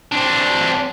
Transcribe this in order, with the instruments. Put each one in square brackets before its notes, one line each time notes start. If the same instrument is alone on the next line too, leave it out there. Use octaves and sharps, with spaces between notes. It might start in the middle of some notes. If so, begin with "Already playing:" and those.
[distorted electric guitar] C4 D4